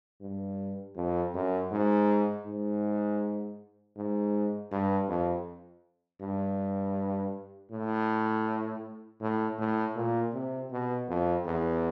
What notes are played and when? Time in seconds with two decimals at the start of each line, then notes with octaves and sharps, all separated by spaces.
0.21 G2
0.96 F2
1.34 F#2
1.72 G#2
2.46 G#2
3.97 G#2
4.72 G2
5.09 F2
6.21 G2
7.71 A2
9.21 A2
9.59 A2
9.96 A#2
10.34 C3
10.71 B2
11.08 F2
11.46 E2